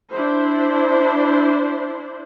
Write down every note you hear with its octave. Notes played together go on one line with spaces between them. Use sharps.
D4 E4 C5